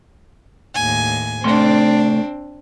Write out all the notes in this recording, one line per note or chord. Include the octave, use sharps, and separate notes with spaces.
D#2 A2 G#5
C2 A3 C4 D4 C6